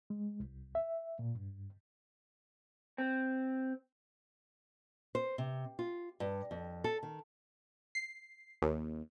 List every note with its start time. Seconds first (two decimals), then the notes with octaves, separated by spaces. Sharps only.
0.10 G#3
0.40 C2
0.75 E5
1.19 A#2
1.35 G2
2.98 C4
5.15 C5
5.38 C3
5.79 F4
6.20 G2
6.51 F2
6.84 A4
7.03 D#3
7.95 C7
8.62 D#2